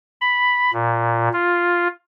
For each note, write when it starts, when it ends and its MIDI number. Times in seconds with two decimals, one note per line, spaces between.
0.21 0.71 83
0.73 1.29 46
1.33 1.88 65